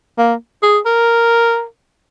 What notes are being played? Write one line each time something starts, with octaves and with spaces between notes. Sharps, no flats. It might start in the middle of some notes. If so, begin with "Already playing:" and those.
A#3
G#4
A#4